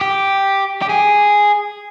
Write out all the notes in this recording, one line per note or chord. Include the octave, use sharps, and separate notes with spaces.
G4
G4
G#4